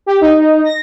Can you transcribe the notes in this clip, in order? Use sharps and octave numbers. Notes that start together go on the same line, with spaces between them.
G4
D#4
A#6